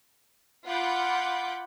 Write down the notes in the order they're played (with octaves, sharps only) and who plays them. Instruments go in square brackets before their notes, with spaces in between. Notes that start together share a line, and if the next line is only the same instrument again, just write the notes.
[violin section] F4 F#5 B5 D6 G6